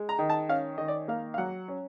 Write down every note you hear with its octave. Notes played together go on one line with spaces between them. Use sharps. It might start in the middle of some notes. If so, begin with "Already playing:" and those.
Already playing: G#3
A#5
D#3
A5
C#4 F5
D#3 D#5
D5
A#3 F5
F5
F#3 F#5
C#4